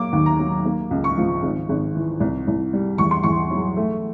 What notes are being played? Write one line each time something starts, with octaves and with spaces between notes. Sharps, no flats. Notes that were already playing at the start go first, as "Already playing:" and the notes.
Already playing: F#3 A#3 D6
D#2
A#5
F#3
A#3
C#2
C#6
F3
G#1
G#1
E3
C2
C2
G3
E2 C#6
C6
E2 C#6
F#3
A3